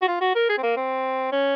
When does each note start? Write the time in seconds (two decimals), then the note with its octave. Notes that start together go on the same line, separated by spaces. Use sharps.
0.02 F#4
0.08 F4
0.21 F#4
0.35 A#4
0.49 G#4
0.58 C4
0.63 A#3
0.77 C4
1.32 C#4